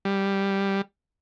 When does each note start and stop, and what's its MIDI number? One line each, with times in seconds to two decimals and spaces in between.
0.05 0.81 55